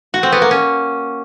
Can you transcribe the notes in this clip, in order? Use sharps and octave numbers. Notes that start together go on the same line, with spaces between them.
F#4
C4
B3
A#3
C#4